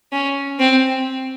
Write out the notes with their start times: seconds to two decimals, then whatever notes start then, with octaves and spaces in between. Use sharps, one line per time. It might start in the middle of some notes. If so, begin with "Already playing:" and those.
0.12 C#4
0.60 C4